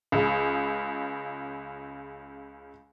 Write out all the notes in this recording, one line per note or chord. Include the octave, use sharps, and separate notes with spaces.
C#2 C#3